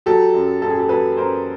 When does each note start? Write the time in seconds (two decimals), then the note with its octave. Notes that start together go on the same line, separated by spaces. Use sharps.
0.06 F#3 G4 A4
0.34 F#2
0.62 F#2 A4
0.70 G#4
0.78 G4 A4
0.89 F#3 A4 B4
1.17 F#2 A#4 C5